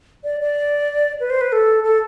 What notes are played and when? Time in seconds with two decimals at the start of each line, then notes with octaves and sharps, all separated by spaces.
0.24 D5
0.40 D5
1.20 B4
1.30 C5
1.41 B4
1.52 A4
1.84 A4